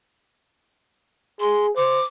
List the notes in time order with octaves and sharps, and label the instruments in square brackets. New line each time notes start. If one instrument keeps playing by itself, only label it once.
[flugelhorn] G#4 [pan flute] C6
[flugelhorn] C5 [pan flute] D6